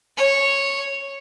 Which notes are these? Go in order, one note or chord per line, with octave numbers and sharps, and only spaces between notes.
C#5